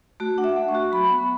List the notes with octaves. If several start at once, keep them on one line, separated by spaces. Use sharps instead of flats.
A3 F#4
D4 F#5
E5
A3
C#6
F#4
F#3 B5
B3